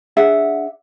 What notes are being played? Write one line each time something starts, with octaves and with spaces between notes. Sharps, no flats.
D4 G#4 E5 F#5